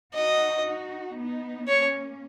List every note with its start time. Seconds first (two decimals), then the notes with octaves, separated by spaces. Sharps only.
0.14 D#4 F#4 D#5
0.66 D#4 F#4
1.17 B3 D#4
1.68 A#3 C#4 C#5